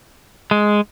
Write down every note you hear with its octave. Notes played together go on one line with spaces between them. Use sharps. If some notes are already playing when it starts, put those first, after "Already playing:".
G#3